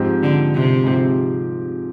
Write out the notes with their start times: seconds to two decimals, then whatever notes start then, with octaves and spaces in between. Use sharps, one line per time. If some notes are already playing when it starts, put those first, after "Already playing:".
Already playing: G#2 F3 C4 G4
0.23 D3
0.54 C3
0.84 G#2 F3 C4 G4